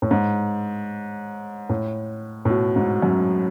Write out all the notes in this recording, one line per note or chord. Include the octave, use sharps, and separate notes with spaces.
A2
G#2
A2
A2
B2
G#2
F#2